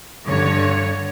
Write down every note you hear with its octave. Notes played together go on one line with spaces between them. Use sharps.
G2 D3 C#5